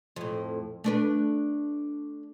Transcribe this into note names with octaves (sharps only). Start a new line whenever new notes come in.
F2 A2
A3 D4 B4